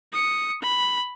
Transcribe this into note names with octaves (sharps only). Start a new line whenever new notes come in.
D#6 C#7
B5